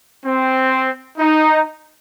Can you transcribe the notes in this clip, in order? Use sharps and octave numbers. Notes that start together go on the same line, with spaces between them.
C4
D#4